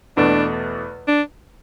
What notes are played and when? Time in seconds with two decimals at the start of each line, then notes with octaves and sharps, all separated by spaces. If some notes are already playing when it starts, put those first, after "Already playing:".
0.17 E2 B2 A3 D4
1.08 D4